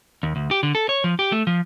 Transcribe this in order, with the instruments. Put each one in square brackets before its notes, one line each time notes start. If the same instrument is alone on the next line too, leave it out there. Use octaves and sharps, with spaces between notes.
[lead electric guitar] D#2
D2
G4
D3
A4
C#5
F3
G4
A3
F3